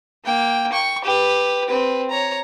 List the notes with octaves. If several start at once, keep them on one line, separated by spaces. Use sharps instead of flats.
A#3 G5
G5 C#6
G4 B4
C4 B4
C#5 A#5